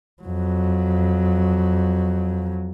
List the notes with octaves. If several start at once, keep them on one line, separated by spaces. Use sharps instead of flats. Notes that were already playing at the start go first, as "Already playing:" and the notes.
F2 F#3